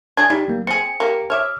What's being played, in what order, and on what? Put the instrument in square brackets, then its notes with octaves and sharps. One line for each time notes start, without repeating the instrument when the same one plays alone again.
[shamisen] D4 G#4 [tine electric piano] G#6
[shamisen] G3 [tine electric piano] D#4
[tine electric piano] F#3 A#3
[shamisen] C4 G#4 [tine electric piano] C#7
[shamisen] A#3 G4
[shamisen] C#5 E5 [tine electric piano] D6 F6